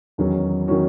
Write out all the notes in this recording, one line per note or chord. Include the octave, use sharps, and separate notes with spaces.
E2 D#3 F#3 C#4 F#4
D#3 F#3 C#4 F#4